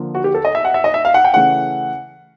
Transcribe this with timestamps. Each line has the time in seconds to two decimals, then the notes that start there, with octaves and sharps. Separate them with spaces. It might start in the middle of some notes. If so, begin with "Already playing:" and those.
Already playing: D3 F3 A#3
0.15 F#4
0.24 G4
0.34 A4
0.45 D#5
0.55 E5
0.65 F#5
0.74 E5
0.84 D#5
0.94 E5
1.05 F5
1.14 F#5
1.25 G5
1.34 C#3 E3 A3 C#4 F#5